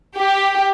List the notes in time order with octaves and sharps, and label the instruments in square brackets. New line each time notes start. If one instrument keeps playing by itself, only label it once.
[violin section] G4